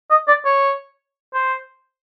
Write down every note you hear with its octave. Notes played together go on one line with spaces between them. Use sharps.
D#5
D5
C#5
C5